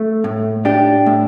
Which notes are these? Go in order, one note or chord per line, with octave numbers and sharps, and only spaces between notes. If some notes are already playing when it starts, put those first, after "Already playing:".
Already playing: A3
A2
D4 G4
A2